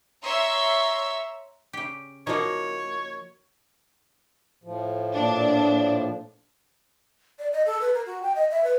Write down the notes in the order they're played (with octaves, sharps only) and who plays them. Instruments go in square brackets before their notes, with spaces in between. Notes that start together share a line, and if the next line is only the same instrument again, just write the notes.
[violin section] C#5 E5 A#5 C6 C#6 E6
[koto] C#3 G4
[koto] F3 A#3 [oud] D#4 F#4 [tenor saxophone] C#5
[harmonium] A2 F3
[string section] A#2 D4
[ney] D5
D#5
A4
B4
A#4
F#4
G5
D#5
E5
B4